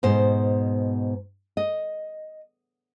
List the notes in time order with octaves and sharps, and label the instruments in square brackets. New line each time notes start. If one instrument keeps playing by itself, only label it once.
[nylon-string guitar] G#2 B2 C5
D#5